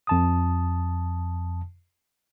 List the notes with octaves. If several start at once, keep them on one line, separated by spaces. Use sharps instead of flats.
F2 A5 D#6